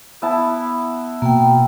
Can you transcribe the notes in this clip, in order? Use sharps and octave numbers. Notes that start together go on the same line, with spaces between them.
B3 E4 A5
B2 A#3 G5